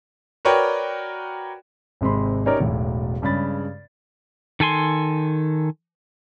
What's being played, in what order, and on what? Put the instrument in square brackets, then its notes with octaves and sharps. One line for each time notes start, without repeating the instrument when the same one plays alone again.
[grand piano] F#4 A#4 B4 C#5 D5 G5
G#1 C3 G#3 C4 B5 C6
C#4 D#4 G4 A#4 C#5 D5
E1 B1 A2
G2 C#3 G#3 B5 A6
[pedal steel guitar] D#3 A4 G#5 C6